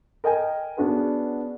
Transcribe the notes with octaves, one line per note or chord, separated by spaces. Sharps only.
A#4 D#5 G5 G#5
B3 C#4 D4 F#4 G#4 B4